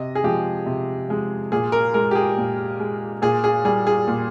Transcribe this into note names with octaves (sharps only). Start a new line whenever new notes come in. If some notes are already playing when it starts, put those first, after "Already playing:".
Already playing: C3 D#5
G#4
F3 G#3 G4
C3
F3 G#3
A#2 G#4
A#4
G#3 A#4
G4
G#4
A#2
G#3
A#2 G#4
G#4
G3 G#4
G#4
A#2